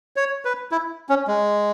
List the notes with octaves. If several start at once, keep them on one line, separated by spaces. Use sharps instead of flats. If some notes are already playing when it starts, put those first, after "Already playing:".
C#5
B4
E4
C#4
G#3